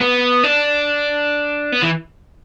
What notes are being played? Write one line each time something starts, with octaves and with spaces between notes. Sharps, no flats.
B3
D4
B3
E3